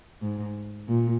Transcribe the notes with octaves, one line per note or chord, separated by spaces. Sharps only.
G#2
A#2